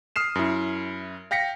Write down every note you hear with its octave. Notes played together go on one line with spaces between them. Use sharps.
D#6 F6 C7 E7
F#2 E4
F5 G5 A#6 B6 C#7